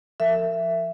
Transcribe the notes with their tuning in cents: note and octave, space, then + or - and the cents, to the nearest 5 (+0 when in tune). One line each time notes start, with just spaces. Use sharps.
F3 -15 A#4 -35 E5 +10